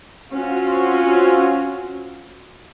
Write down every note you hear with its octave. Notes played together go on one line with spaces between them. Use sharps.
C4 C#4 F4 F#4